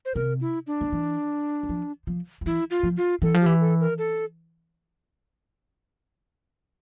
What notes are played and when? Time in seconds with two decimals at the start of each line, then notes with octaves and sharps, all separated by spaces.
0.05 C5
0.15 C3 A#4
0.41 E4
0.67 D4
0.81 D3
0.92 E3
1.63 G3
1.69 F3
2.07 F3
2.41 F3
2.46 E3 E4
2.71 F4
2.83 F3
2.97 F4
3.22 E3 A4
3.34 F3
3.41 G4
3.46 E3
3.61 A4
3.80 A#4
3.98 A4